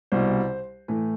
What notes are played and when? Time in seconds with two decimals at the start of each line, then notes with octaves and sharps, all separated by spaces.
0.12 C2 B2 G3 C5
0.88 A2 E3 A3